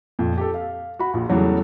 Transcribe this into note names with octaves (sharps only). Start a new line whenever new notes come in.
F2 A#2
G4 A4
F5
F#4 B5
A#1 A#2
E2 C#3 F#3 G3 A3